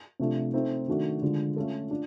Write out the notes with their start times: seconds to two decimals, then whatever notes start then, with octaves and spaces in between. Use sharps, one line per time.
0.20 C3 F3 A3 D4
0.53 A3 C4 D#4
0.88 D#3 F#3 A3 D4 F#4
1.22 D3 F3 G#3
1.56 A3 C#4 F4 A4
1.90 D4 F4